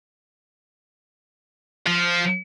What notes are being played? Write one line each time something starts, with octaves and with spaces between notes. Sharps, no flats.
F3